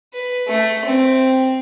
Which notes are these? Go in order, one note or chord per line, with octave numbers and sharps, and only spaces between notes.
B4
A3
C4